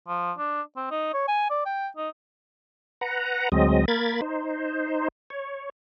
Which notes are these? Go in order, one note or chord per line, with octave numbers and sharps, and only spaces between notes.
F3
D4
C4
D#4
C#5
G#5
D5
G5
D#4
B4 F#5 A#5
D2 F#3 G#3 C4 D#5
A#3 A#4 B5 G#6 A6
D#4 C5
C#5